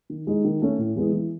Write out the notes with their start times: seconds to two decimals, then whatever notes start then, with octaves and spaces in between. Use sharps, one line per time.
0.10 D#3
0.27 G#3 D#4
0.45 D#3
0.62 A3 C#4
0.78 A2
0.96 E3 G#3 B3
1.13 E3